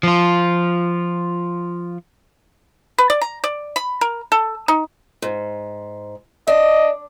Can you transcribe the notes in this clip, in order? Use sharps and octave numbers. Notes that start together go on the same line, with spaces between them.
F3 F4
B4
D5
A#5
D5
B5
A#4
A4
D#4
G#2
D4 D#5